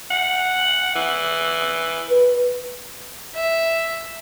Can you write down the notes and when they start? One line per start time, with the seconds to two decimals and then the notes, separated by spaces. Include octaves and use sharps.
0.11 F#5
0.96 E3
2.10 B4
3.35 E5